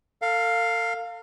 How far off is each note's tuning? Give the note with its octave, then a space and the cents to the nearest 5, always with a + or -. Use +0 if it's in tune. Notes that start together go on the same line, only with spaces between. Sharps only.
A4 +45 F5 +5